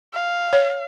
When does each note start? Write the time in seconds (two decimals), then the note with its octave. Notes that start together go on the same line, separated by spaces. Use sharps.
0.14 F5
0.53 C#5